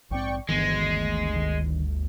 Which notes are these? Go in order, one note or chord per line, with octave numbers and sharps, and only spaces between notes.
A#1 G#2 C4 D5 G5 C#6
G1 D2 D#3 E3 G#3 B3
D#3